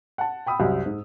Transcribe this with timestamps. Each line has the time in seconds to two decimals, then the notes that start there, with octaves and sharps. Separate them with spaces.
0.18 F#5 A5
0.47 G5 B5 D#6 E6
0.60 C2 F#2
0.86 G#2